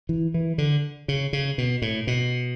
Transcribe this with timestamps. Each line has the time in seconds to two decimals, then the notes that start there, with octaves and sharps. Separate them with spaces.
0.09 E3
0.34 E3
0.58 D3
1.08 C#3
1.33 C#3
1.58 B2
1.82 A2
2.07 B2